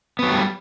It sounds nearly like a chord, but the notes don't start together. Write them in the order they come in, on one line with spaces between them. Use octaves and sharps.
B3 F#3 A3 G3